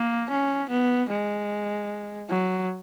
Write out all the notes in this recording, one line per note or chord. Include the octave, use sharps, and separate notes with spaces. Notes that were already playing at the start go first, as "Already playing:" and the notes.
Already playing: A#3
C#4
B3
G#3
F#3